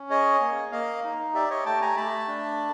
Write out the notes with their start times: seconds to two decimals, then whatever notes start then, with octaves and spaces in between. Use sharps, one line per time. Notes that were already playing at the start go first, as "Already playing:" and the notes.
Already playing: C#4
0.10 G#4 C#5 D#5
0.41 A#3
0.72 A#3 D#5 F5
1.04 D#4
1.34 G4 D5 E5
1.50 C#5 D#5
1.65 A3 G5 A5
1.82 G#5 A#5
1.97 A3 A5 B5
2.28 D4